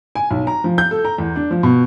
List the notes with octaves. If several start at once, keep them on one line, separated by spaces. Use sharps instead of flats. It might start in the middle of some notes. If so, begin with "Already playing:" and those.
G#5
B1
A#5
F3
G6
A4
A#5
E2
D4
F3
B2